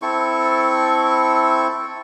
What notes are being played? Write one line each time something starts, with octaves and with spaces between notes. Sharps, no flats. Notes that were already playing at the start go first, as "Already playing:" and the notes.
C4 E4 A4 C#6